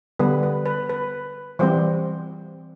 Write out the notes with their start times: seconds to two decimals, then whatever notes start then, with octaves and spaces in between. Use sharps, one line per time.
0.19 D3 G3 B3 B4
0.43 B4
0.66 B4
0.89 B4
1.59 E3 G3 C4 C5